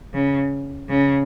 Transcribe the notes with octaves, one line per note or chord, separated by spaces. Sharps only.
C#3
C#3